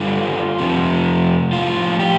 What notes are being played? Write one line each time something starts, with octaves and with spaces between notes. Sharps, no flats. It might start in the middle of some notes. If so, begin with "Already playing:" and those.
Already playing: G2 D3 G3 F4
F2 C3 F3
A2 F3 F4
G4